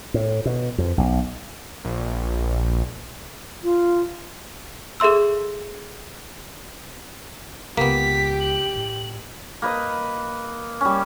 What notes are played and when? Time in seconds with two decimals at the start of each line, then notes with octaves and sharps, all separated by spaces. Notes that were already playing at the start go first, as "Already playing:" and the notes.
0.14 A2
0.46 B2
0.78 F2
0.98 B1
1.85 A#1
3.63 F4
5.00 G#4 A4 E5 C6 E6
7.77 C#2 A#3 B3 G4 B6
8.40 F#7
8.75 A2
9.62 A#3 B4 D#5
10.81 G3 C#4